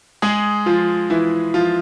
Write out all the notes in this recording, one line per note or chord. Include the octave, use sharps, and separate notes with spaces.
G#3 G#4
F3 F4
E3 E4
F3 F4